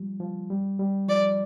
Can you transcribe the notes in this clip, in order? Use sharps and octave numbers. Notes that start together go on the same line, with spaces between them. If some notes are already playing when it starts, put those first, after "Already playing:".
Already playing: F3 G3
F3
G3
G3
F3 D5